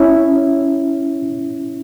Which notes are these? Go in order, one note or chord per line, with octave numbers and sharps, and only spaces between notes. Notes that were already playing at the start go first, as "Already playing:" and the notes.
Already playing: C#4 E4